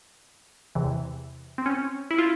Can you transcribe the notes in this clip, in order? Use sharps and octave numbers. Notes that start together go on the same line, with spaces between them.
E2 C3 E3
C4
C#4
E4
F4